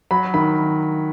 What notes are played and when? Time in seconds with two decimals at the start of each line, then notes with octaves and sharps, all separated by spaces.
0.11 F#3 B5
0.34 D#3 B5